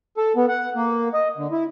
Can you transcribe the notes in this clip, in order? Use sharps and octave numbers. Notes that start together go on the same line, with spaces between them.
A4
B3
F#5
A#3
D#5
D3
E4